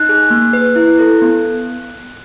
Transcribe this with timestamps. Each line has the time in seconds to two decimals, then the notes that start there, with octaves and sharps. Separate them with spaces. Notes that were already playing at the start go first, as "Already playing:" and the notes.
Already playing: D#4 F#6
0.09 G#4
0.31 A#3
0.53 B4
0.76 E4
0.99 A4
1.22 B3